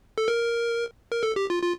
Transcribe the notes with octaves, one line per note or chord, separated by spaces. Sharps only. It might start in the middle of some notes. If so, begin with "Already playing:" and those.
A4
A#4
A#4
A4
G4
F4
F4